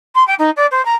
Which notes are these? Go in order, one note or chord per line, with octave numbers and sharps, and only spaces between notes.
C6
G5
D#4
D5
C5
A#5